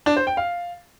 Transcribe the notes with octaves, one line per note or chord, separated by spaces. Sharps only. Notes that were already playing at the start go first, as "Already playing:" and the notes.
D4
C5
G5
F5